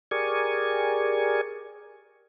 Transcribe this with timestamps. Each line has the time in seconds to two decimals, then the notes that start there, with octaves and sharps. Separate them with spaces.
0.11 G4 G#4 A#4 D5 G#5 C#6